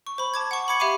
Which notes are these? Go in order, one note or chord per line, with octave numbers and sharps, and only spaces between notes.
C#6
C5 B5
A5 D6 G#6
F#5 C#6
B5 C#6 D6 G#6 C#7
G4 E5 F5 B5 D6 D#7